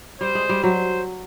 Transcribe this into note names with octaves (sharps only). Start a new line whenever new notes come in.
G3 C5
G#3
G3
F#3 C5